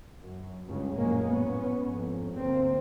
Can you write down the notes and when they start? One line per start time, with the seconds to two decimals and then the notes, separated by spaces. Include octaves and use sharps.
0.20 F#2
0.67 C#2 G2 C#3
0.96 A#1 F#2 A2 G#3 A#3 C#4
1.27 A2 B3 C#4
1.87 F2 G#2
2.35 D2 G2 A#3 C4